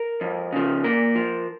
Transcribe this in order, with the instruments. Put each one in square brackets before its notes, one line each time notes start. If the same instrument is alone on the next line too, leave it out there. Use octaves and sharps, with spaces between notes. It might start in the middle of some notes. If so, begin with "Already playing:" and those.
Already playing: [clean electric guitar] A#4
F2
C#3 F3
A#2 A#4
F3